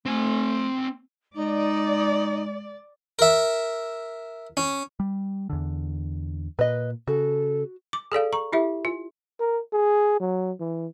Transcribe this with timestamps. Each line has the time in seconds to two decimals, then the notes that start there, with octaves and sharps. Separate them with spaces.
0.06 A3 C4 G#5
1.34 G#3 D#4 D5
3.19 A#4 E5
4.57 C#4
5.00 G3
5.50 E2 D3
6.59 A#2 B4 D#5
7.08 C#3 F#4 A4
7.93 D6
8.12 G#4 A4 D5 F5
8.33 A#5 C#6
8.53 E4 G4 E5
8.85 F4
9.40 A#4
9.73 G#4
10.20 F#3
10.60 E3